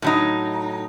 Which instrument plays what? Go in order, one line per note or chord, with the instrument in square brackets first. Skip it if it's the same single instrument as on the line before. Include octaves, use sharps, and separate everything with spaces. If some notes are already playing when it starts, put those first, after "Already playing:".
[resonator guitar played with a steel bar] A2 F#3 D#4